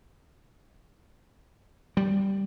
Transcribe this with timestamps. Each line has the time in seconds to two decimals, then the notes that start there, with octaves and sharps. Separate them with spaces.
1.97 G3